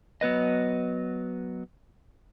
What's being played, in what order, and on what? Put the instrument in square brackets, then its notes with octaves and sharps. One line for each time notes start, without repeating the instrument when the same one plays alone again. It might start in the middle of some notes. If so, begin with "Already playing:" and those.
[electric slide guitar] F#3 B3 B4 D#5